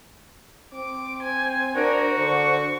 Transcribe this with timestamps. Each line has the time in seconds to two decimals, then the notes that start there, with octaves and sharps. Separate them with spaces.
0.74 C4 D6
1.23 C5 G#5
1.76 D4 F#4 A#4
2.18 D3 C#6